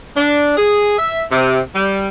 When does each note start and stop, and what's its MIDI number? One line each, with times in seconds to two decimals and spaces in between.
0.16 0.57 62
0.57 0.96 68
0.98 1.21 76
1.31 1.59 48
1.74 2.09 55